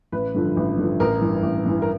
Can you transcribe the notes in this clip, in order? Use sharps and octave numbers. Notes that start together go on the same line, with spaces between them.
A1 B4
G2 D3 F3
A1
G2 D3 F3
A1 A#4
G2 E3
A1
G2 E3
A#4